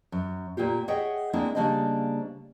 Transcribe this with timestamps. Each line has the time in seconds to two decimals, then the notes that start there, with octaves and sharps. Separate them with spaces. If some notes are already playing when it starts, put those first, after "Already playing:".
0.12 F#2
0.57 A#2 A#3 F4 G4
0.88 G#4 C#5 D#5 E5 F#5 G5
1.33 G#3 A#3 C4 D4 E4
1.55 C#3 G3 A#3 D4 C5 D#5